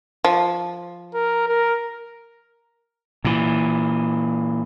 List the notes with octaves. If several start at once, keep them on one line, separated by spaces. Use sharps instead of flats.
F3
A#4
A#4
A#2 E3